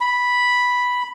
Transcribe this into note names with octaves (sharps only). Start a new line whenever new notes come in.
B5